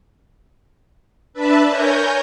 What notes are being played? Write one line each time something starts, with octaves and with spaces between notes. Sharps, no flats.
D4 B4 E5 A5 B5
A#4 C#5 G#5 A#5 G6